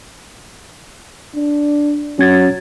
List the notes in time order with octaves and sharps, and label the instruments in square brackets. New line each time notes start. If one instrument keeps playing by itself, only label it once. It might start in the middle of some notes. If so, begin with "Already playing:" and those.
[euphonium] D4
[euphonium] F#3 [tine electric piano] C#4 G#6 A6